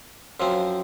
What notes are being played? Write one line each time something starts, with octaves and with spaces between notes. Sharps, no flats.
F#2 F3 C4